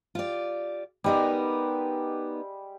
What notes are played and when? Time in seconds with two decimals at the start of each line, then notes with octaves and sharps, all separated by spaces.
0.15 F4 G4 D5
1.04 G3 G#3 B3 D#4 G4 A#4